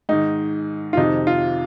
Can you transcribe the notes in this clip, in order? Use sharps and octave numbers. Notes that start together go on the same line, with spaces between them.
G#2 D#3 D#4
F4
F2 C3 D#3 D#4
F4